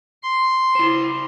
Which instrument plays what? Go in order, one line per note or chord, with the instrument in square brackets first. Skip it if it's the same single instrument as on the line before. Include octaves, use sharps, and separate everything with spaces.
[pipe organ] C6
[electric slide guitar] E4 C5